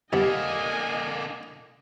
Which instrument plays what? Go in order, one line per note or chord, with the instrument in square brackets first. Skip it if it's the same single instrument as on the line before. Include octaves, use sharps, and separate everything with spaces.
[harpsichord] G2 B3 [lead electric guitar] D3 A#3 [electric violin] D#5 G#5